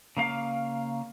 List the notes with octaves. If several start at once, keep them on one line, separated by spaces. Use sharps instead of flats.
C#3 A#3 F5